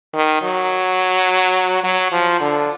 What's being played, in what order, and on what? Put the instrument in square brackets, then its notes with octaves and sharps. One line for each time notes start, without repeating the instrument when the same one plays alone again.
[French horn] D#3
F#3
F#3
F3
D3